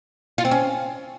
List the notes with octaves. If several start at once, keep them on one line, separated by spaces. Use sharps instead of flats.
F4
C4
C#4